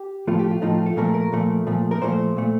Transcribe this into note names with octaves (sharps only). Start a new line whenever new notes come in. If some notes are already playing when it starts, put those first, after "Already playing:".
Already playing: G4
A2 F3 A3 F4
G4
F4
A2 F3 A3 D#4
F4
A4
A#2 F3 A3 A#4
A#4
A#2 F3 A3
A#2 F3 A3
A#4
A#2 F3 A3 C5
A#2 A3